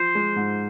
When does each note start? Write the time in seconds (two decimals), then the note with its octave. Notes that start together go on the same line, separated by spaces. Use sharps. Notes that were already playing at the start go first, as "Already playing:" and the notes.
Already playing: F3 C5
0.15 G#3
0.36 G#2